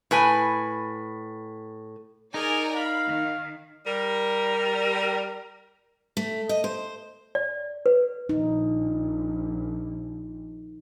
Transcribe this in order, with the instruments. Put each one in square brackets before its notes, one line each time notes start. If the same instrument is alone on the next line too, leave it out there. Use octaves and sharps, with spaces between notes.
[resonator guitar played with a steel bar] A2 B4 G#5
[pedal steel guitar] D#4 [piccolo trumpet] G#4 [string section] A#4 D5 G#5
[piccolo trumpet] F5 [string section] B5
[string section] D#3
[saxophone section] G3 A#4
[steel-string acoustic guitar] A3
D#5
C5
[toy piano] D5
B4
[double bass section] A#1 [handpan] D#4